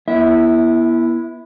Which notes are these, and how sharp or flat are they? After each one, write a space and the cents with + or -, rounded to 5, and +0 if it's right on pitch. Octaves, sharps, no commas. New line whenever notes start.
B3 -30 E4 +10 E5 -20